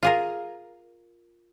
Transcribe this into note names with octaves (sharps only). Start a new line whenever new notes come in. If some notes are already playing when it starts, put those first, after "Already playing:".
F4 G#4 A#4